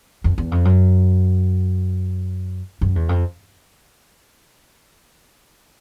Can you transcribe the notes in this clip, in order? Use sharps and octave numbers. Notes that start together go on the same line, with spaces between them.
F2
E2
F2
F#2
F#2
E2
F2